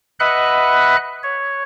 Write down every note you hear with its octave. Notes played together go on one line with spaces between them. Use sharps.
B4 D#5 E5 F#5 B5 F#6
C#5